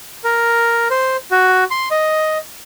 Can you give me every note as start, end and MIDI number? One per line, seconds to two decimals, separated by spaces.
0.24 0.88 70
0.90 1.17 72
1.31 1.64 66
1.71 1.89 84
1.91 2.38 75